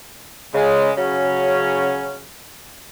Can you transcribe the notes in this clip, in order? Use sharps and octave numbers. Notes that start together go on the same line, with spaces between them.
C#3 G#3
C#3 F#3 C#4